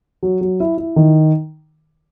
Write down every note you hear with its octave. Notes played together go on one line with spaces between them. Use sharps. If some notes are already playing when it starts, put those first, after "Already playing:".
F#3
F#3
E4
E4
D#3